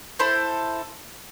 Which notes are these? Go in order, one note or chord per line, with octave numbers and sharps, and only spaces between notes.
E4 A4 C5